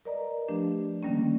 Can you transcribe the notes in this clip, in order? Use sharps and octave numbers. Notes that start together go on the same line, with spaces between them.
A#4 B4 D5 D#5 A#5
F3 A3 D4 G4
D3 D#3 G3 A#3 C#4